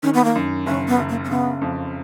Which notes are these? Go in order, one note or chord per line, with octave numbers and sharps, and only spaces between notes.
D#3 C#4
B3
A#3
F#2
F#1 C#4
B3
F#1
A#3
C#4
C#3 B3
F2